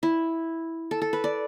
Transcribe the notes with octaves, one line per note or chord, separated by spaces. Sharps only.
E4
A4
A4
B4
D5